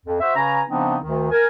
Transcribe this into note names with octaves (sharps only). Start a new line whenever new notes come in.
F2
F#4 C5 E5
C#3 C#4 B4 G#5 A#5
C#3 F3 B3 C4 D4 D#4
D2 D#3
A#4 G#5